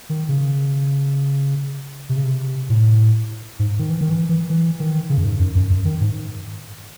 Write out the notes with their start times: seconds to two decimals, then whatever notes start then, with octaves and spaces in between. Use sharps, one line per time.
0.10 D#3
0.29 C#3
2.09 C3
2.17 C#3
2.23 C3
2.69 A2
3.59 G#2
3.79 D#3
3.90 E3
4.01 D#3
4.10 E3
4.29 E3
4.50 E3
4.80 D#3
5.10 C#3
5.18 F#2
5.26 G#2
5.40 F#2
5.55 F#2
5.70 F#2
5.85 D#3
6.01 G#2